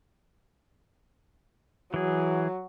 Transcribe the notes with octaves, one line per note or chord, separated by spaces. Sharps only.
E3 F#3 G#4